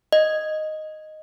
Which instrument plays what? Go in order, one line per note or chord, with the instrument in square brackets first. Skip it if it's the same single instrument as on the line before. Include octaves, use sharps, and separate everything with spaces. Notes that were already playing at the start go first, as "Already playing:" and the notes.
[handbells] D#5